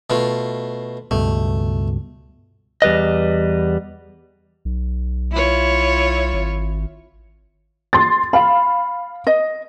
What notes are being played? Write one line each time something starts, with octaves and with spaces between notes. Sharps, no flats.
B2 A3 F4
C#2 G2 B2 A3
E2 G3 B4 D#5
B1
E4 F4 C#5
G#1
C6 A6
F5 B5
D#5